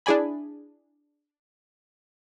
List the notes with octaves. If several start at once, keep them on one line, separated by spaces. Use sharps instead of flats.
D4 E4 G#4 D5 G#5 B5